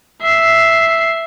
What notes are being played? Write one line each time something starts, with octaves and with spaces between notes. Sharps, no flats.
E5 C7